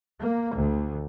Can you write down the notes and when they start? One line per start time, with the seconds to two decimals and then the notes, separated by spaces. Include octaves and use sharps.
0.18 A#3
0.54 D2